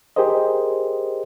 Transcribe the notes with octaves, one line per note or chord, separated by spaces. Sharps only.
G4 G#4 A#4 C5 D#5